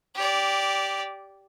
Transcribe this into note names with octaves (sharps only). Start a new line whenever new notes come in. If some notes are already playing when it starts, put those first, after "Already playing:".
G4 D5